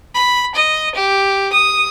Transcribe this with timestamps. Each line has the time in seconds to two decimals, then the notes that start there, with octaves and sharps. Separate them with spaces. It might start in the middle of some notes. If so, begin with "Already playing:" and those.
0.15 B5
0.55 D#5
0.95 G4
1.53 D#6